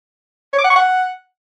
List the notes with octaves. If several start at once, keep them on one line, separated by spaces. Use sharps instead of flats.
C#5
D6
F#5
C#6
F#5